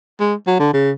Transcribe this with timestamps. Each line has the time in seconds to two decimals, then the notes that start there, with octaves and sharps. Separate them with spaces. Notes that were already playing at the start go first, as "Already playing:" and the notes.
0.20 G#3
0.47 F#3
0.60 D3
0.73 C#3